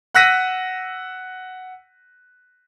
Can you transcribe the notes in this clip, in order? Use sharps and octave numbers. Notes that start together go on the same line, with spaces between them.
F#5 E6 F#6 A#6 B6 D#7